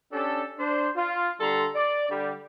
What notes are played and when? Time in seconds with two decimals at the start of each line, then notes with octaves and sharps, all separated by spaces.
0.12 C#4 D4 G4 A4
0.59 D4 C5
0.96 F4
1.41 D3 G3 A4 A#5 C6
1.75 D5
2.10 D3 G3 G4